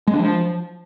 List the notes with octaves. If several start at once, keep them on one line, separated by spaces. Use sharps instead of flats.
G#3
D4
F3